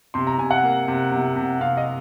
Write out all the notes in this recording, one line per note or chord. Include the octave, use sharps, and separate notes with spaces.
C3 C6
A#5
C3 G#5
F#5
A#3
C3
C3
C3
C3 F5
D#5